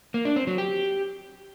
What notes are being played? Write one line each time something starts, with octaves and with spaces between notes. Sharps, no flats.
A#3
D4
C4
F#3
G4